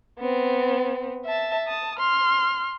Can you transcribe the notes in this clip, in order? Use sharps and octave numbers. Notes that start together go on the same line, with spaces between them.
B3 C4
E5 A5
A5 D#6
C6 F6